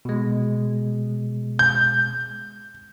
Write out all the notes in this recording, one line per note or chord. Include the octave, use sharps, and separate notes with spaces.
B2 G#3
G6